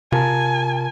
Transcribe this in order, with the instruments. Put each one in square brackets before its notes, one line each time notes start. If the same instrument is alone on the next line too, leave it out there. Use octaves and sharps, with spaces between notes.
[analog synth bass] C3 [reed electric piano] F4 A#4 A5 [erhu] G#5